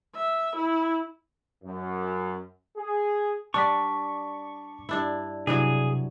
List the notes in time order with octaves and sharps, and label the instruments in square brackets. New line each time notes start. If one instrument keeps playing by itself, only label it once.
[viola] E5
E4
[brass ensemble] F#2
G#4
[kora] G3 D4 [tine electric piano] A5 D6 B6 [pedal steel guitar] C#6
[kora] G2 D4 E4
[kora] G2 E3 F#3 [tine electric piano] C3 [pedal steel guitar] G#4